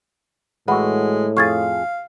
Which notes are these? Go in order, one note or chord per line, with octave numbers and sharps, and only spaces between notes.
A2 E3 G#3 F#4 F#5 B5
F2 F4 G#4 F5 C#6 G#6 A6